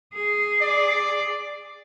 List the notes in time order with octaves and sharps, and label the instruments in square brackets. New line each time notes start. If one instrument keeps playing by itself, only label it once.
[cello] G#4
[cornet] D5